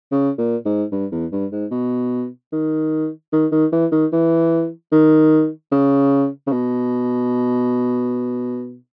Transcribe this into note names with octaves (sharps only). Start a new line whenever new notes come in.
C#3
A#2
G#2
G2
E2
G2
G#2
B2
D#3
D#3
D#3
E3
D#3
E3
D#3
C#3
C#3
B2